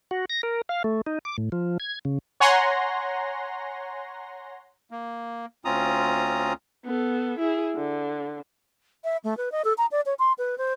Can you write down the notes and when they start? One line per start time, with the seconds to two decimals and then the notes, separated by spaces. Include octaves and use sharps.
0.11 F#4
0.30 A#6
0.43 A#4
0.69 F5
0.84 A3
1.07 D#4
1.25 D6
1.38 A2
1.52 F3
1.80 G#6
2.05 C#3
2.40 C#5 F#5 G#5 A#5 C6 A#6
4.91 A#3
5.65 D2 C4 C#4 F4 A#5 D#6
6.85 B3 A4
7.39 E4 G#4
7.76 D3
9.04 E5
9.24 A3
9.37 B4
9.52 D#5
9.65 A4
9.78 A#5
9.91 D5
10.06 C#5
10.19 C6
10.38 B4
10.58 C5